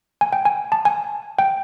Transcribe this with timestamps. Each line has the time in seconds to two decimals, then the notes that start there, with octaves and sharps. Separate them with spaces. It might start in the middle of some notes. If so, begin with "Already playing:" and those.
0.21 G#5
0.33 G5
0.45 G#5
0.72 A5
0.85 G#5
1.39 G5